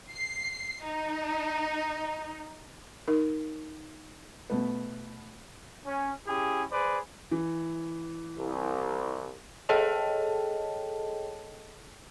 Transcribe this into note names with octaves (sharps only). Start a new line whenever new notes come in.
C7
D#4
D#4 A#4
B2 A3 B3
C#4
C#4 E4 G4 G#4
G#4 B4 C5 D5
E3
C2
G#4 A4 C#5 D#5 G5 A5